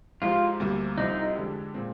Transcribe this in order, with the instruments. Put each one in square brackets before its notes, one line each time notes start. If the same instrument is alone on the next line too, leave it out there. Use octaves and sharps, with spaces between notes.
[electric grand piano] G#2 F3 G#3 D#4 G4 [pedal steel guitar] F4
[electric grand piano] D2 C3 G3 A#3
[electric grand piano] C2 C3 F3 C4 [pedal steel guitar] D#4
[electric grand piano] F2 D3 G#3 D4 G4
A#2 G#3 C4